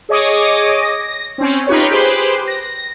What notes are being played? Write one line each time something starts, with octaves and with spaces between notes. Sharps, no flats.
G#4 C#5 D#5 D6 D#6
A#6
C4 C#4
D#4 F4 G4 B4 C#5
G4 G#4 B4 C5
A#6